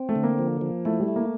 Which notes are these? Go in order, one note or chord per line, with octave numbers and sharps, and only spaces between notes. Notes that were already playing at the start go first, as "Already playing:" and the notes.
Already playing: C4
A3
D3
A#3
F3
F3
A3 E4
G3
A3
A#3